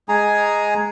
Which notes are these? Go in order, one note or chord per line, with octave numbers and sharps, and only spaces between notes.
G#3 G#4 G#5 A#5